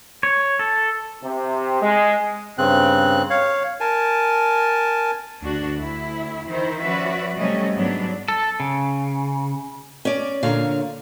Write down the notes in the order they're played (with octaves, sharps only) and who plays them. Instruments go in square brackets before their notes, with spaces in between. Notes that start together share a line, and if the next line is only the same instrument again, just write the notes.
[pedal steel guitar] C#5
A4
[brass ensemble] C3
G#3
[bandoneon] G2 C#3 C4 F#6
C#5 F5
A#4 G#5 A5
[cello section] D2 D4 F#4
D2 E4
D#3 E3 E4 C5
F3 C#4 F#4 B4 D5 E5
C3 F#3 G3 A3 C#4 D#5
G#2 F#3 B3 D4
[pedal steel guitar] A4
C#3
[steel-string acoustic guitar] C#4 D5
A#2 D3 C#5 F5 A#5